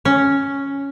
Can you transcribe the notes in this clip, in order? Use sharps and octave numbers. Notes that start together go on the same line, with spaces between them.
C#4